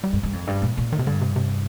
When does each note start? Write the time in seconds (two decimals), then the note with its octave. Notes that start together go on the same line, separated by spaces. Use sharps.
0.04 G3
0.13 G2
0.23 G2
0.33 F2
0.47 G2
0.62 A#2
0.77 A#2
0.92 A2 D#3
0.99 C3
1.06 G2 D3
1.21 C3
1.36 C3